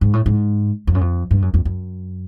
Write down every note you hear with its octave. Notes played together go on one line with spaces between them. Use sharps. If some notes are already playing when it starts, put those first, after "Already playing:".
G#2
A2
G#2
F2
F#2
F2
G2
F#2
F2
F#2